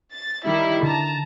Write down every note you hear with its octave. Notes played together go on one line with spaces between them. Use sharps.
A6
D#3 G3 E4
D3 A5 A#5